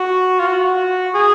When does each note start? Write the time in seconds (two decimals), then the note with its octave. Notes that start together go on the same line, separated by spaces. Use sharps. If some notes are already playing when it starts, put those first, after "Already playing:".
Already playing: F#4
0.40 F4
0.47 F#4
0.64 F#4
1.15 G#4